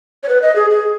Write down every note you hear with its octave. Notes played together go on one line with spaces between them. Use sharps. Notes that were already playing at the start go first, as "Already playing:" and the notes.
C#5
B4
D#5
G#4
G#4